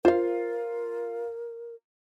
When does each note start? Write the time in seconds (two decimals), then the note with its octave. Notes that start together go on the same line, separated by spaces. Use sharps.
0.05 F4 A#4 C5 F5